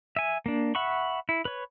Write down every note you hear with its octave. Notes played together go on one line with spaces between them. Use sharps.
E5 G#5
A#3 D4
E5 F#5 B5 C#6
E4
B4 C#5